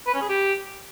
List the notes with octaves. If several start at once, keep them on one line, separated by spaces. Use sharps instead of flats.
B4
C#4
G#4
G4